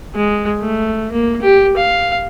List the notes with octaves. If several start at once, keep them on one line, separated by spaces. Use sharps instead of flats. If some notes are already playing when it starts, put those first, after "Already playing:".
G#3
A3
A#3
G4
F5